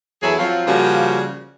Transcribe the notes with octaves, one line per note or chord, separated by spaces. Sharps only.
E2 F#3 E4 G#4 A4 E5
F3 F#3 C4 F4
C#3 F3 G3 A#3 F#4